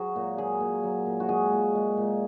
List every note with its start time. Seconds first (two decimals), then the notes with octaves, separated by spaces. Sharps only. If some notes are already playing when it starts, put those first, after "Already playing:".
Already playing: F#3 F#4 G#4
0.16 A#2
0.38 F#3 G#4
0.61 A#2
0.83 F#3
1.06 A#2
1.20 F#4
1.29 G#3 G#4
1.53 A#2
1.75 G#3
1.97 A#2